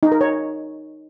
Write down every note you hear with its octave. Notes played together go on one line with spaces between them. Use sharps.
D#4
A#4
C#5